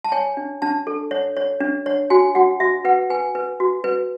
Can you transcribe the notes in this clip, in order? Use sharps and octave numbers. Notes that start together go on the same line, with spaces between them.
A5
C#5 G#5
D4
D4 A5
A4
C#5
C#5
D4
C#5
F#4 G#5
F#4 F#5
F#4 E5
B4 F#5
B4 G#5
B4
F#4
B4